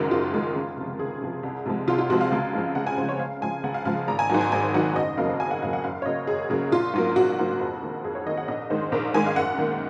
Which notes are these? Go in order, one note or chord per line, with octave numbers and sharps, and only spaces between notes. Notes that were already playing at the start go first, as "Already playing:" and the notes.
Already playing: F#1 F#2 D#3 G#3 F#4 A#4
F#1 F4
F#2 D#3 G#3
C#2
C3 F3
C#2 G#4
C3 F3
C2
C3 F3 G#3
C2 F4
F4
C3 F3 G#3 F#4
F5
C#2
C#3 F3 G#3
C#2 F#5
G#5
C#3 F3 G#3 C5
C#5
C#2 F5
C#3 F3 G#3 G#5
C#2 F#5
F5
C#3 F3 G#3 F5
G#1 A#5
G#5
G#2 D#3 F#3 G#5
G#5
G#1 G#5
G#2 D#3 F#3 F#5
F#1 D#5
F2 C#3 F#3 A#3 F5
F#1 G#5
F#5
F2 C#3 F#3 A#3 F5
F#5
F#2 F5
C#5
C#3 F#3 A#3 D#5
F#2 G#4
C#3 F#3 A#3 G#4
A#1 F4
G#2 F#3 A#3
A#1 F#4
G#2 F#3 A#3
F2
D#3 A#3
F2 G#4
C#5
D#3 A#3 D#5
F#5
A#1 D#5
G#2 D#3 G#3 C5
A#1 A#4
G#2 D#3 G#3 G#5
F5
F#2 F#5
D#3 A#3